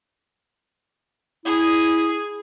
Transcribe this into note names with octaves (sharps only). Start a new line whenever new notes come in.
E4 G#4